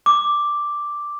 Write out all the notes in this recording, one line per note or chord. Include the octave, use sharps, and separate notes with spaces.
D6